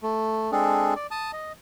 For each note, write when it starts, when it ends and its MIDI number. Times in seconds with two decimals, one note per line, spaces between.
0.03 0.51 57
0.52 0.94 56
0.52 0.94 60
0.52 0.94 62
0.52 0.94 68
0.52 0.94 69
0.96 1.07 74
1.11 1.31 81
1.11 1.31 87
1.33 1.52 75